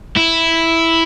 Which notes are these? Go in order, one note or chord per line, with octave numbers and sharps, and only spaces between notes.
E4